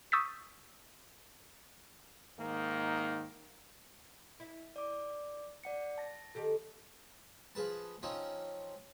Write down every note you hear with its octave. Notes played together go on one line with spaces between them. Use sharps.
C#6 D#6 E6 G6 A6 B6
G#2 D#3 A#3 D#4
E4
D5 D6
D5 F#5 C#7
A5 A#6
D#3 G4 A4
F3 G#4 B4 A5
F3 C4 C#4 D#4